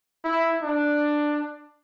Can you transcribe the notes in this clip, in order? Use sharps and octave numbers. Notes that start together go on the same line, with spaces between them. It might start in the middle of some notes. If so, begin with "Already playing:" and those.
E4
D4